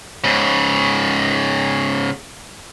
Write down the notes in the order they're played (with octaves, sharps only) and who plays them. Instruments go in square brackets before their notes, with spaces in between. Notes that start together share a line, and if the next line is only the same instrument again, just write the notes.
[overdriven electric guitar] G#2 C#3